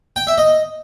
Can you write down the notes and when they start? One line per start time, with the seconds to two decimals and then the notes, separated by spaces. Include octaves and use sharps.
0.16 G5
0.27 E5
0.38 D#5